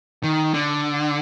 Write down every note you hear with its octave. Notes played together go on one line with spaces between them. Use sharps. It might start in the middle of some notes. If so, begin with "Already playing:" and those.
D#3
D3